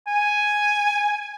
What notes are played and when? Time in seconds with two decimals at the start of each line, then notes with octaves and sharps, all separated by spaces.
0.07 G#5